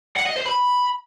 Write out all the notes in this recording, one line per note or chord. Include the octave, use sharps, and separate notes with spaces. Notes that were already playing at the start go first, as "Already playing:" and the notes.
F#5
D#5
C5
B5